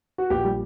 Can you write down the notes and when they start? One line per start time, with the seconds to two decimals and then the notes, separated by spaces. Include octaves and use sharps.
0.18 F#4
0.30 A#1 G4
0.45 G3